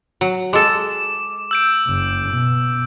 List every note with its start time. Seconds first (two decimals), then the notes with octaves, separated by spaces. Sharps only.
0.21 F#3
0.53 G#3 A4 D6 E7
1.51 E6 G6 D7
1.87 F#1
2.28 B2